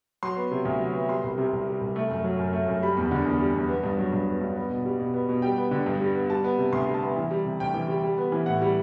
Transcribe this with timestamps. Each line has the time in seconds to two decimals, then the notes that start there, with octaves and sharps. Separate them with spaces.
0.23 F#3 C6
0.37 B3
0.51 C3
0.65 D2
0.79 F#3
0.94 B3
1.09 G3 C6
1.24 C2
1.38 C3
1.52 C2
1.67 G3
1.81 C2
1.96 A3
2.10 F#2
2.24 F#3
2.39 F#2
2.53 A3
2.68 F#2
2.82 G3 B5
2.97 E2
3.11 D3
3.26 E2
3.40 G3
3.54 E2
3.69 B3
3.84 G2
3.98 F#3
4.13 G2
4.27 B3
4.41 G2
4.56 B3
4.70 B2
4.85 G3
5.00 B2
5.14 B3
5.29 B2
5.42 G3 G5
5.58 B3
5.71 D3
5.86 G2
6.00 G3
6.15 B3
6.30 G3 A5
6.44 B3
6.58 C3
6.73 D2 C6
6.87 G3
6.94 A5
7.02 B3
7.17 E3
7.31 G3
7.45 C3
7.60 D2 G5
7.74 E3
7.88 G3
8.03 G3
8.18 B3
8.32 E3
8.46 A2 F#5
8.62 G3